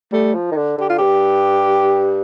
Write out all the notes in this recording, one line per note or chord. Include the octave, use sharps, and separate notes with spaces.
G3 A3
F3
D#3
D3
D3 G4
F4
G2 G4